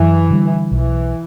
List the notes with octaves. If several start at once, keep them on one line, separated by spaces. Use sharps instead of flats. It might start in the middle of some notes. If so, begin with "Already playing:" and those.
Already playing: F#2 E3
D3 G3
B1 E3